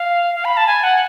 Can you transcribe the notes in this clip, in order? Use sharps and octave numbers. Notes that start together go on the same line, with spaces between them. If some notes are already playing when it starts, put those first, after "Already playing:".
Already playing: F5
F5
B5
A5
G#5
F#5